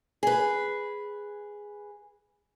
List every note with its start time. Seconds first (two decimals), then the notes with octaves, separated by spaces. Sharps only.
0.23 G#4 B4